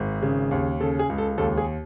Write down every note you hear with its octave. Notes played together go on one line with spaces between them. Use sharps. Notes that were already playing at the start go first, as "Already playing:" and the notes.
Already playing: G#1 G#2
C#3
D#2
C#3 A4
G#4
C#2
A4
D#2 A4
G#4